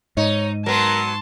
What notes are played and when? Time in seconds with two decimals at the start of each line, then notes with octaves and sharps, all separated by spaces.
0.17 G#2 D#4 C#5
0.66 F#3 B3 A#4 A5 C6